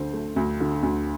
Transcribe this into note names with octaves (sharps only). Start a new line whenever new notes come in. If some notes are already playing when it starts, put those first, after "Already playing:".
Already playing: D2 D3 C5
A3
D2
D3
D2